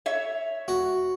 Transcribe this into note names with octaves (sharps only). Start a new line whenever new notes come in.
C#5 E5
F#4